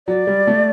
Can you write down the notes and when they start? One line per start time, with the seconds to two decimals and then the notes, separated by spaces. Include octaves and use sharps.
0.07 F#3 D5
0.27 G3
0.47 A3